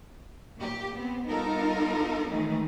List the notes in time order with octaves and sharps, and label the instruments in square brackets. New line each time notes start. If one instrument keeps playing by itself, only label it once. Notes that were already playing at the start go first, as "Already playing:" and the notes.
[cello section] A#2 G4
B3 C4
G3 B3 D#4 F4 A4 A#4
D#3 E3 F#3 G#3 A3 D#4